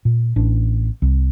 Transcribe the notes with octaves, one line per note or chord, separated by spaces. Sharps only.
A#2
A1 D4
C2